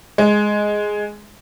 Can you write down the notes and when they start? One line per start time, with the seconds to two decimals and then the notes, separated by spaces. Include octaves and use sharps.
0.18 G#3